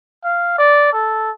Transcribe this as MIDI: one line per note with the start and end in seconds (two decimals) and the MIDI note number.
0.24 0.57 77
0.58 0.90 74
0.93 1.31 69